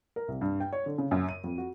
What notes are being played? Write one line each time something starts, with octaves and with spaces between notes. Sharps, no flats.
A#4
C2
G2
G5
C#5
D3
C#3
F#2
D#7
F2
F#4